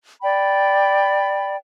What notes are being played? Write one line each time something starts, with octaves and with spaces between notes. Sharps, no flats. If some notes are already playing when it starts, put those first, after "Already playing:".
D5 G5 B5